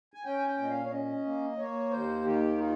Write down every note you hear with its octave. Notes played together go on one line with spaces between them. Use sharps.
G#5
C#4 G5
G#5
G5
A#2
D#5
F5
C#5
C#4 D#5
A#3
A#3 C#5
D#2 C5
D#3 G4
D#4 F4